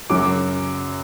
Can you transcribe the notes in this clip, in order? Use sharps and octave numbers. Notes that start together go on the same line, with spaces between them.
F#2 C#3 F#3 D6